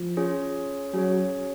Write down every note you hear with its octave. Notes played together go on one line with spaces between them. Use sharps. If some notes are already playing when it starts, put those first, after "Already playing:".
Already playing: F3
C#4 F4 G#4 C#5
F#3 C#4 G#4 C#5